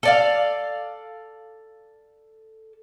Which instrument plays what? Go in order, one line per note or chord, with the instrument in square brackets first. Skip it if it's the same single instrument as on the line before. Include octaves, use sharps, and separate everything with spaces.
[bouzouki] A4 D5 F5